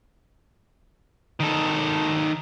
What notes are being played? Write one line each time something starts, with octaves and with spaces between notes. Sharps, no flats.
D#3 A4